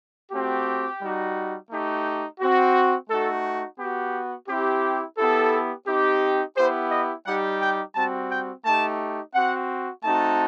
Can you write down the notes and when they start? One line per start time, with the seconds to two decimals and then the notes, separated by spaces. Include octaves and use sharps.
0.32 A3 C4 F#4 G4
1.02 G3 D#4 F#4
1.70 A3 D#4 G4
2.40 C4 F#4
3.10 A3 D#4 F#4 A4
3.79 B3 F#4 G4
4.48 C4 E4 G4
5.18 B3 E4 G4 A4
5.87 C4 D#4 G4
6.56 B3 E4 G4 C5
6.91 D#5
7.26 G3 D#4 G4 F#5
7.61 G5
7.95 G3 C4 F#4 A5
8.30 G5
8.65 A3 D#4 G4 A5
9.34 C4 F#4 F#5
10.04 A3 C4 D#4 F#4 A5